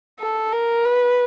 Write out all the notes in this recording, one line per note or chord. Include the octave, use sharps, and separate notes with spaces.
A4
A#4
B4